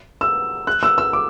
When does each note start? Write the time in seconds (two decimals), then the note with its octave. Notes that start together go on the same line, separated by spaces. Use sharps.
0.21 E6
0.67 F#6
0.83 E6
0.98 E6
1.13 D6